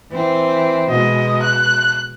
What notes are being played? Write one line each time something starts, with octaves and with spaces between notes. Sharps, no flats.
E3 C4
B2 G#3 D#5
F#6